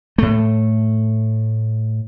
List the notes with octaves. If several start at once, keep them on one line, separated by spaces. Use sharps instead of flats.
A2 A3